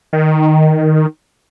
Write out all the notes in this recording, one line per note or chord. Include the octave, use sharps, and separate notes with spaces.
D#3